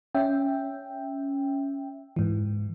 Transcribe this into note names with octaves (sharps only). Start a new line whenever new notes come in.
C#4 E5 G5
G#2 E3